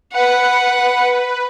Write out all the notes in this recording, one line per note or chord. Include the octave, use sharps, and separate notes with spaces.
B4 F#5